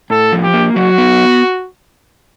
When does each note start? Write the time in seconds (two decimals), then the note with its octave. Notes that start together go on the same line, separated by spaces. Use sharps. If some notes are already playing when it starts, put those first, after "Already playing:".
0.10 A2 A4
0.33 F3
0.43 G4
0.54 A#3
0.76 F#3 F#4
0.98 B3